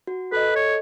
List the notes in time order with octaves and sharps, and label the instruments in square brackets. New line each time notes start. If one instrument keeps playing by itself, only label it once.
[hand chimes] F#4
[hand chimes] A4 D#5 [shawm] B4
[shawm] C#5